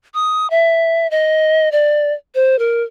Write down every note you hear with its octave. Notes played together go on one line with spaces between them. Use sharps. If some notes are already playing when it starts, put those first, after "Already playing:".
D#6
E5
D#5
D5
C5
A#4